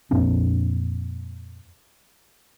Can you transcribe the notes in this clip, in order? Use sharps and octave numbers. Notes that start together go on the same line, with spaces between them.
F2 A#2 C4 D4